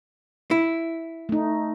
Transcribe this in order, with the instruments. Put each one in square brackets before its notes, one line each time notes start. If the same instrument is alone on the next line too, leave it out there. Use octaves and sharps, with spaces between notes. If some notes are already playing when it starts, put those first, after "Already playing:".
[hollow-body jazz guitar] E4
[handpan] A3 D#4